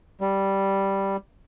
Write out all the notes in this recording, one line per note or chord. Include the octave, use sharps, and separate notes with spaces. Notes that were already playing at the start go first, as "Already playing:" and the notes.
G3